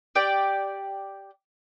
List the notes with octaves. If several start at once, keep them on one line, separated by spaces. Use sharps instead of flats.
G4 D5 G5